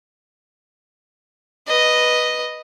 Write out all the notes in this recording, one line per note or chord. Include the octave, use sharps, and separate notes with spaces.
B4 D#5